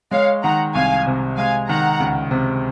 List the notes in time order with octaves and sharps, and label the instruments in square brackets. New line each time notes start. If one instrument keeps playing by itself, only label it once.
[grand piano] G#3 [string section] C#5 F5
[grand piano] D#3 [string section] F#5 A#5
[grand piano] C2 [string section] F5 G#5
[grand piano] C3
[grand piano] G#3 [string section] F5 G#5
[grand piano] D#3 [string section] F#5 A#5
[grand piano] C#2
C3